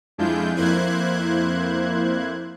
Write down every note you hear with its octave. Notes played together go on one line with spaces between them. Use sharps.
F2 G#3 D4 E4 F4 G6
F2 A#3 E4 C5 F#6 G#6